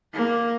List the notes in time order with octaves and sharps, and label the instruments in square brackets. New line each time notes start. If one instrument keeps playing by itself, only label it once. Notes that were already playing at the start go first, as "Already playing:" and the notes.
[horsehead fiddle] A#3